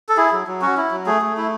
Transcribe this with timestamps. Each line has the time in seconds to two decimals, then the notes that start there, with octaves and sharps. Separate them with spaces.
0.09 A4
0.17 E4 G#4
0.32 F#3
0.47 F#3
0.61 C#4 F#4
0.77 E4
0.91 F#3
1.06 A3 G#4
1.22 A3
1.37 E4